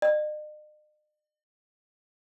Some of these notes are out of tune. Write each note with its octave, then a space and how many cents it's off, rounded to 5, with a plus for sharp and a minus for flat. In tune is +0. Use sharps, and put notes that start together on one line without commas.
D#5 -45